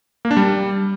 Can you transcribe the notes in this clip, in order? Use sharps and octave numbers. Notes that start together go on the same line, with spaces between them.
A#3
D4
G3